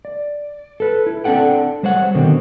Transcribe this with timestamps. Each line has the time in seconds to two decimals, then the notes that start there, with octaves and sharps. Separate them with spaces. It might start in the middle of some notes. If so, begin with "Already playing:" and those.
0.05 D5
0.80 A4 B4
1.06 E4
1.24 C4 D4 A4 F#5 G5
1.83 G3 C5 C#5 F#5
2.15 B2 D3 D#3 C4